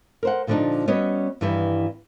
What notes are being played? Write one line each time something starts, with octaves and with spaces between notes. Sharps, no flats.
A#4 C5 F#5
A#2 D3 F3 A#3 D4 D#4
G3 B3 C#4 F#4 C#5 D#5
G2 D#3 E3 G3 B3